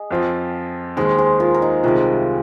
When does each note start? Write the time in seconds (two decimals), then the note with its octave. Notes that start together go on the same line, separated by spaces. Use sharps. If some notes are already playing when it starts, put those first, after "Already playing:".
Already playing: G#4 D#5
0.11 F2 F3 C4 F4
0.97 D#2 D#3 G#3 G#4 C5
1.18 G#4 C5
1.40 F4 A#4
1.54 A#4
1.62 D#4 G#4
1.83 C2 C3 D#3 G#3 F4 A#4